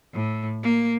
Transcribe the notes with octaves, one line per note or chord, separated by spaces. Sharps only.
A2
A#3